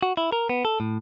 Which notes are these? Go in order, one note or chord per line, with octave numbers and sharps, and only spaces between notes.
F#4
E4
A#4
B3
A4
A2